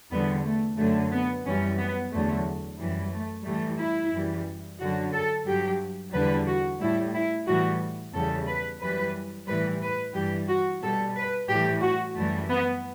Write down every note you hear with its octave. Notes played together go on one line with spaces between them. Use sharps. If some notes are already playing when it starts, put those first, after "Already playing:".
E2 D3 G3 B3
A3
F#2 D3 F#3 A3
B3
F#2 E3 G3 C#4
B3
E2 D3 F#3 A3
F#2 E3 G3
A3
A2 E3 G3 A3
E4
F#2 E3 G3
F#2 D3 F#3 F#4
A4
G2 F#3 G4
E2 D3 G3 B4
F#4
A2 G3 E4
E4
A2 E3 G3 F#4
E2 C#3 G3 A4
B4
F#2 E3 G3 B4
A2 E3 G3 B4
B4
G2 E3 G3 G4
F#4
B2 G3 A4
B4
A2 E3 G3 G4
F#4
F#2 E3 G3 A3
B3